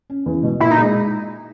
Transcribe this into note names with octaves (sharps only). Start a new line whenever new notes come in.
C#4
E2
B2
A#2 E4
D#4
G#3